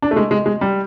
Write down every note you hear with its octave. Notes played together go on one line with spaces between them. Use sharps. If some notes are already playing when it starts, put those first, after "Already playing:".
D4
A3
G#3
G#3
G#3
G3